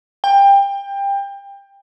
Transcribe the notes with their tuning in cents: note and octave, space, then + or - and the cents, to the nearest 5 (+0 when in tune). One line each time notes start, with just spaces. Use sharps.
G5 +20